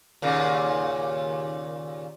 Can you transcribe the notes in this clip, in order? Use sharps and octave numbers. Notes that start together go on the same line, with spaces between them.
D#2 A#2 C#3